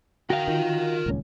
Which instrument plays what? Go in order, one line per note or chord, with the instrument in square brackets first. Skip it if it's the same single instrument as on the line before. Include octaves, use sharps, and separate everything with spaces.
[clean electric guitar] F#4 F5 [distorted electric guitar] A#4 G5
[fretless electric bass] D#3 [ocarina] F4
[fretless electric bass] D#1 C#2 C#4